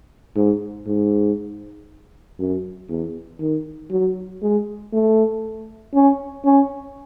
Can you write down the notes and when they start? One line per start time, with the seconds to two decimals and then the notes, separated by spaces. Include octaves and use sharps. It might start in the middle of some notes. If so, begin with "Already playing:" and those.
0.36 G#2
0.87 G#2
2.39 F#2
2.89 E2
3.41 D#3
3.91 F#3
4.42 G#3
4.93 A3
5.94 C#4
6.45 C#4